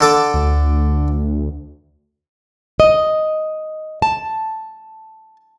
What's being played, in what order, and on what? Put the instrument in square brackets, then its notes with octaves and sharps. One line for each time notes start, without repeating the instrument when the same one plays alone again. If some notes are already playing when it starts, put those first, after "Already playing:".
[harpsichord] D3 A4 D6
[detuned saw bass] D2
[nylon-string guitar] D#5
A5